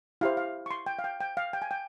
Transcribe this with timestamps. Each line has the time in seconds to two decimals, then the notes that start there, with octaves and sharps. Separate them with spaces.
0.21 E4 G4 C5 F5
0.37 F5
0.66 C#6
0.71 C6
0.86 G5
0.99 F5
1.04 G5
1.20 G5
1.37 F5
1.53 G5
1.62 G#5
1.71 G5